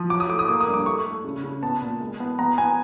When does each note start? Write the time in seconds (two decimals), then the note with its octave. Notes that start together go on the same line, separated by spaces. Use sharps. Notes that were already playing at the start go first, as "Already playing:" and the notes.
Already playing: F3
0.10 F#3 D6
0.20 D#6
0.29 A3 D6
0.39 D#6
0.48 A#3 D6
0.61 D#6
0.68 G2
0.74 D6
0.86 A3 C#6
1.06 A3
1.24 C#3
1.43 C#3
1.62 B3 A5
1.82 A#2
2.01 G#3
2.20 B3
2.39 B3 A#5
2.58 B3 G#5